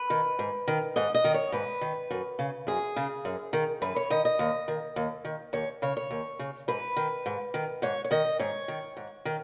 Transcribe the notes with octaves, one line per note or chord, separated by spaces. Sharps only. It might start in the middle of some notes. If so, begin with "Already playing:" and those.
Already playing: B4
D#3
G#2
D#3
G#2 D#5
D#5
D#3
C#5
G#2 B4
D#3
F#2
C#3
F#2 G#4
C#3
F#2
D#3
F#2 B4
C#5
D#3 D#5
D#5
D#2
D#3
D#2
D#3
D#2 C#5
C#3 C#5
C#5
D#2
C#3
G#2 B4
D#3
G#2
D#3
G#2 C#5
C#5
D#3 D#5
G#2 C#5
D#3
G#2
D#3